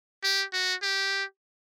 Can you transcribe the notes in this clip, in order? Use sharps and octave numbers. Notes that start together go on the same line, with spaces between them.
G4
F#4
G4